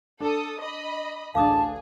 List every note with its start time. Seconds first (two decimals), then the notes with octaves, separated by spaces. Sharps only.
0.20 D4 A4 D#6
0.61 D#5 B5
1.35 A1 D2 D4 G#4 F5 A5 D6 D#6